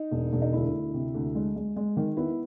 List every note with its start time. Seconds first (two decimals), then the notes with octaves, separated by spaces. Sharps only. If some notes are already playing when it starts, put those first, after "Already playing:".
Already playing: D#4
0.11 E1
0.33 E1
0.42 D#4
0.53 D2 E4
0.73 D2
0.94 C3
1.14 D2
1.35 G#3
1.56 G#3
1.76 G#3
1.97 D#3
2.17 B3 E4